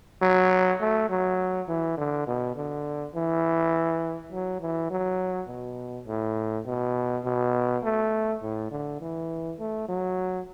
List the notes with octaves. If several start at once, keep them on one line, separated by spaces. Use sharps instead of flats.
F#3
A3
F#3
E3
D3
B2
D3
E3
F#3
E3
F#3
B2
A2
B2
B2
A3
A2
D3
E3
A3
F#3